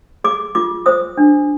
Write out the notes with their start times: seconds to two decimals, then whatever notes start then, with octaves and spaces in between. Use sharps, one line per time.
0.24 G#4 D6
0.55 F4 D6
0.86 C5 D#6
1.17 D4